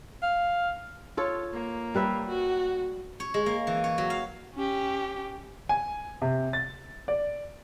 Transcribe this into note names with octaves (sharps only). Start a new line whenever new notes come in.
F5
F4 A4 C#5
A#3
G3 B4 E5
F#4
C#5
G#3
A#3
E3
C#5
F#3
F5
C#4 G4
G#5
C3
A6
D5